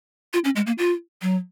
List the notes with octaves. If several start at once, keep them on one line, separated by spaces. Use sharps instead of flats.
F4
C#4
G#3
A#3
F4
F#3